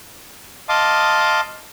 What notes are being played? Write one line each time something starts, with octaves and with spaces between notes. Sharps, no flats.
D#5 F5 A5 C6 D6 D#6